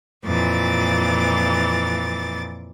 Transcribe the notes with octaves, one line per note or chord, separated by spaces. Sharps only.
F2 A#2 E3 D6 A6